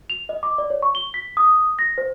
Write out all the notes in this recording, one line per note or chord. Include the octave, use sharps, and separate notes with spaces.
F7
D#5
D6
D5
C#5
C#6
G7
B6
D#6
A#6
C5